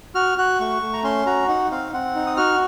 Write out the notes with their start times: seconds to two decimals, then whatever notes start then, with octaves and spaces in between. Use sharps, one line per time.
0.15 F#4 F6
0.38 F#4 F#6
0.60 A3 C#6
0.82 A3
0.93 A#5
1.03 C#4 C6
1.26 F#4 A#5
1.48 D#4 F#5
1.71 C4 F5
1.93 C4 F#5
2.16 D#4
2.26 D#6
2.37 F#4 F6